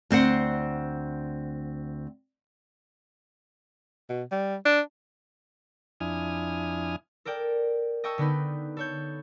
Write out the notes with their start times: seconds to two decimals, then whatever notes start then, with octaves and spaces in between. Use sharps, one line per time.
0.11 D2 C4 C5 F#5
4.09 B2
4.31 G3
4.65 D4
6.00 F2 D4 E4 G#5 D#6 F6
7.25 A4 A#4 D5 G5
8.04 D#5 G5 A5 C#6 E6
8.18 D3 B3 D#4 B4
8.77 A4 C#5 G6